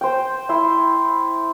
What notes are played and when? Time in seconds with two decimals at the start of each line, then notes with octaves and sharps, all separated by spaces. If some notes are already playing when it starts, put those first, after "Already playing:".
0.01 C5 G5
0.49 E4 C6